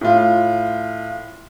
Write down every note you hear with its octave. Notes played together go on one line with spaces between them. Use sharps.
A2 F4